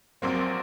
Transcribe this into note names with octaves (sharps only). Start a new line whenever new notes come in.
A#1 A#2 F#3 A#3 C4